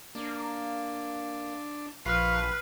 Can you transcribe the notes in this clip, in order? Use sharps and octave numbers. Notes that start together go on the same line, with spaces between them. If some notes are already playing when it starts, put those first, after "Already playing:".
A#3 D4
A#1 F3 B4 F5 C#6 F6 C7